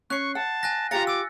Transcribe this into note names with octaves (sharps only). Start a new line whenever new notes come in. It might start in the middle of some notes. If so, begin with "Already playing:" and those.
C#4 C#6 F#6 C7
F#5 A5
G#5 F#6 A#6
F4 G4 F5 A#5 A6 C#7
D6 E6